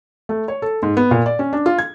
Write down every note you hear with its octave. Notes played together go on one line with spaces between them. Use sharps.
A3
C#5
A4
G#2
B3
A#2
D5
C#4
D4
F4
G#6